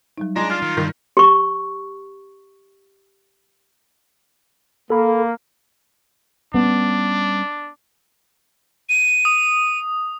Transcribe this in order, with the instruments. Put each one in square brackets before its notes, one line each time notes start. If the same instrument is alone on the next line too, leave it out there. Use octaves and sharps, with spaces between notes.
[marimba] F#3 G3 D#4
[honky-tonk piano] G#3 [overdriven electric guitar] D4 [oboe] A#5 [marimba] C6
[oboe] F4 [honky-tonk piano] F6
[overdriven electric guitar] D#3
[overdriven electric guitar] G2 [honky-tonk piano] D#3
[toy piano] G4 C#6
[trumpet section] A#3 [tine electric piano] A4 B5
[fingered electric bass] G3 C#4 [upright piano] B3 [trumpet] D4
[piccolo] D#7
[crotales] D#6